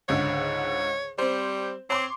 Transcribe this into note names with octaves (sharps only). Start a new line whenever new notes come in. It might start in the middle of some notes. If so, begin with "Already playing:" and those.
C#2 G#2 D3 C#5
G3 C4 C5
C4 C#5 C6 D6